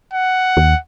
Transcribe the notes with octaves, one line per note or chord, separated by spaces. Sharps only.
F#5
D#2